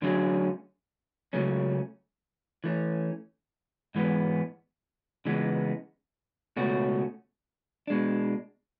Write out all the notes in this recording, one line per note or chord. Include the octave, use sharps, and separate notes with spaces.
D2 D3 F#3 C#4 G#4
C#2 C#3 F#3 A3 C#4
E3 A3 C#4
G#2 E3 G#3 B3
C#3 E3 G#3 B3
C#2 B2 A3 C#4 F#4
B2 G#3 D4